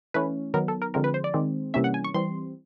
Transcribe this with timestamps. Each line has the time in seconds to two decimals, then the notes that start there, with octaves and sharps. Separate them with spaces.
0.14 E3 A3 C#4 B4
0.54 D#3 F#3 B3 A#4
0.68 A4
0.82 A#4
0.94 D3 F3 G#3 C4 A#4
1.04 B4
1.14 C5
1.24 D5
1.34 D#3 G#3 C4
1.74 C3 E3 G3 A#3 C#4 E5
1.84 F#5
1.94 G#5
2.04 C#6
2.14 E3 G3 C4 C6